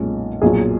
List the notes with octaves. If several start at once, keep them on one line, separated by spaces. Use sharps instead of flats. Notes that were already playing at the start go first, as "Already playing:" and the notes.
Already playing: B1 A#2 G#3 C#4
B1 A#2 F#3 G#4